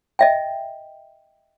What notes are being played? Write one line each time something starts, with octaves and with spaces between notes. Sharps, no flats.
D#5 E5 G5